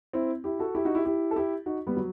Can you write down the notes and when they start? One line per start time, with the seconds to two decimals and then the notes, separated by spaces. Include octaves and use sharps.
0.13 C4 E4
0.44 E4 G4
0.59 F#4 A4
0.75 E4 G4
0.85 D#4 F#4
0.95 E4 G4
1.05 E4 G4
1.31 A4
1.36 E4 G4
1.66 D#4 F#4
1.87 G3 B3
1.97 F#3